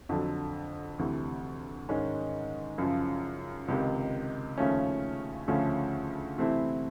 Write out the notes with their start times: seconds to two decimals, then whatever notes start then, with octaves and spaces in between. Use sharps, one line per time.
0.09 F2 D3 F#3
0.98 D2 C3 E3
1.89 G#2 D#3 G#3 C#4
2.78 F#2 C#3 F3
3.68 C#2 C3 D#3
4.58 D#2 C#3 F3 A3 C#4
5.48 D2 C#3 F3 A3 C#4
6.38 C3 E3 A3 C4 E4